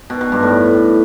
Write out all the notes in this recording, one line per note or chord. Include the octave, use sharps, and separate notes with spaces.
B2
B2
G2
A2